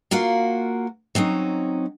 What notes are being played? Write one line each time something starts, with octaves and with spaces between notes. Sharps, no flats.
A#3 F4 F#4 A#4 F#5
F#3 C4 C#4 D#4